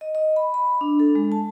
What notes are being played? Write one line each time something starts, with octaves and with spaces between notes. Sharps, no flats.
D#5
D#5
B5
B5
D4
A4
G#3
A5